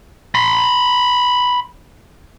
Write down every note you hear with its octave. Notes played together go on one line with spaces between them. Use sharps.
B5 C6